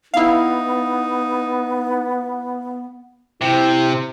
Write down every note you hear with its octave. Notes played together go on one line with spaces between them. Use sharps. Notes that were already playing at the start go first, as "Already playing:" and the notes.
B3 D#4 E4 F5
C3 E4 C5